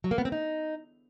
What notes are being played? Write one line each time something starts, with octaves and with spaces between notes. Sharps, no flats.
F#3
A#3
B3
C4
D#4